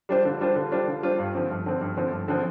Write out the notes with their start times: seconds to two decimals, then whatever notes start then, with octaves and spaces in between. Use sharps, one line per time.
0.09 G3 D4 F4 C5
0.25 D3
0.40 G3 D4 F4 C5
0.56 D3
0.72 G3 D4 F4 C5
0.87 D3
1.02 G3 D4 F4 C5
1.19 G2
1.35 D3 F3 C4
1.50 G2
1.66 D3 F3 C4
1.81 G2
1.97 D3 F3 C4
2.12 G2
2.28 D3 F3 C4